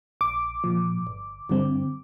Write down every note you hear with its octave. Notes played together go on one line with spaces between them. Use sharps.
A#1 D6
A#2 F3
G1
G2 D3 G3 C4